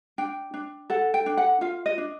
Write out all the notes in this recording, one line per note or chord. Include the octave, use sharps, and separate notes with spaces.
D4 G5
D4
A4 F#5
G5
D4
F#5
F4 F5
D#5
D4